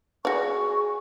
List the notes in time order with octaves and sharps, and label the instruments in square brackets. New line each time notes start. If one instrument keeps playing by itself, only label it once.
[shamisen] F#4 D5 [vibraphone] G#4 [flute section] G#5 C#6